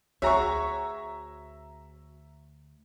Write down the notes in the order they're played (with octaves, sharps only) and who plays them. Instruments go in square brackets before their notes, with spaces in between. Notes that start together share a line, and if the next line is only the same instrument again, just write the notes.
[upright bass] D2 [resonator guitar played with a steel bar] F#4 G#4 C#5 [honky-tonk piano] E5 A#5 C#6